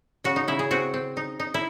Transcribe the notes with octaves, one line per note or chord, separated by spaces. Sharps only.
C#3 F#4
D#4
C#3 E4
G#4
C4 F#4
C4
D#4
D#4
E4